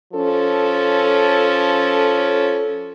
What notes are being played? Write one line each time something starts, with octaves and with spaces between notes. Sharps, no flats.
F3 C#4 A4